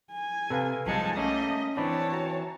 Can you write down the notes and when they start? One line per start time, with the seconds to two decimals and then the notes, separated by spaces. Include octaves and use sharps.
0.12 G#5
0.50 C3 A4 B4 F5
0.86 B1 F3 G3 G#3 D#4 G#5 A5 C#7
1.17 G3 A3 A#3 C#4 C#5 D#5
1.77 E3 C4 D4 C#5 D5 A5 B5
2.13 F#4 A#5